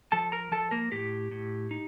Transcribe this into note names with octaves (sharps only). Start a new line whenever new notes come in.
F3 A4 A5
A#4 A#5
F3 A4 A5
A#3 A#4
A2 G4
A2
D#4